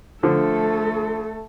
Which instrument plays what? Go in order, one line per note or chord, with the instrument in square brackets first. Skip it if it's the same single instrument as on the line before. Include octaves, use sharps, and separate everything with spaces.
[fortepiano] D3 F3 [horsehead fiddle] A3 A4